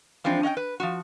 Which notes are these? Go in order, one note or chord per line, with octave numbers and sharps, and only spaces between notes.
E3 F3 G#3 C4 D4
C#4 D#5 F#5 G5
B4
F3 G3 F#4